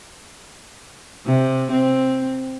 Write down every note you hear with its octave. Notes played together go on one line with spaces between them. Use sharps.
C3
C4